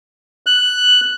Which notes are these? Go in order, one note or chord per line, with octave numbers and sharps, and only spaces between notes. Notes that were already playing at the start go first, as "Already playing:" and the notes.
F#6